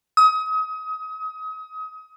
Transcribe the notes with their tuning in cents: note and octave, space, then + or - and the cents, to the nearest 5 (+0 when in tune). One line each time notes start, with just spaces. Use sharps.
D#6 +35